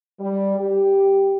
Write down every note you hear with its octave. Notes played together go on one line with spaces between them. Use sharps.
G3
G4